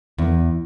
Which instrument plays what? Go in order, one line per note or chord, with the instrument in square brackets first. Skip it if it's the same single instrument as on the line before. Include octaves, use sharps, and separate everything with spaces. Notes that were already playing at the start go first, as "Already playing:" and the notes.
[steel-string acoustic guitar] E2